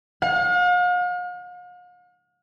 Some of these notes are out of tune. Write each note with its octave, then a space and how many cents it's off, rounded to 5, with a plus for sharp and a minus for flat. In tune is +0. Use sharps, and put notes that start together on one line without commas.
F5 +45